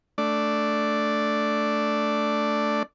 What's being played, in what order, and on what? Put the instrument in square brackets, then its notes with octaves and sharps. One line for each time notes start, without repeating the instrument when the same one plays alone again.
[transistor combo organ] A3 D4 D5